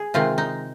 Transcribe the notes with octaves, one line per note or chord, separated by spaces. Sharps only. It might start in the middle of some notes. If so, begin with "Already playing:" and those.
Already playing: G#4
C3 D#3 G#3 F4
D#4